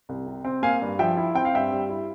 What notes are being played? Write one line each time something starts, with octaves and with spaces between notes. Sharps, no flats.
C2
C3
C4
A#3 F5 G#5
G2
F3 E5 G5
E4
C4 G5
F5
G2 E5 G5
G3
E4